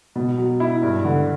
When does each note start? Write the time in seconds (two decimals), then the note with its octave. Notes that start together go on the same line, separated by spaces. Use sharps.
0.16 B2
0.38 F#3
0.60 E4
0.83 G2
1.05 D3